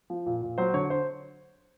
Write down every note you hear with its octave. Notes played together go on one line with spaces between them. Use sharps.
F3
A#2
A#2
F#3 C5
D3 C#5
C5